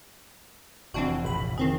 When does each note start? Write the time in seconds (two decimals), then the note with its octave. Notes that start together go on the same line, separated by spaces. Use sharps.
0.94 F1 E3 C4 D4 F#4
1.25 A#1 B5
1.58 D#3 C4 G#4